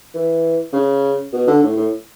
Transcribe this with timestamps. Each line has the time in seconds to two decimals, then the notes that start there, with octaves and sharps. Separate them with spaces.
0.15 E3
0.73 C#3
1.33 B2
1.48 D3
1.63 A2
1.77 A2